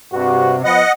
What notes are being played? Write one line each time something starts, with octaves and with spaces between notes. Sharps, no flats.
G2 C3 F#4
F3 B3 D#5 F#5